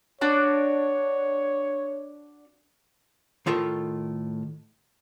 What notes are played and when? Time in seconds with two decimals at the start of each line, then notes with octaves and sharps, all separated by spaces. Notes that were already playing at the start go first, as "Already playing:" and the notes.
0.21 D4 F#4 C#5 D5
3.46 A2 D#3 F4 A4 A#4